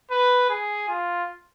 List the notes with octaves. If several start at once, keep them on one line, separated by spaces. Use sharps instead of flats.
B4
G#4
F4